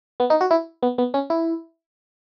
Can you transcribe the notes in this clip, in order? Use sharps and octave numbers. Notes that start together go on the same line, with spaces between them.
B3
D#4
F#4
E4
B3
B3
C#4
E4